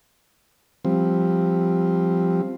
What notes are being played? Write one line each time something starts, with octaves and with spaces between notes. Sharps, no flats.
F3 G3 C4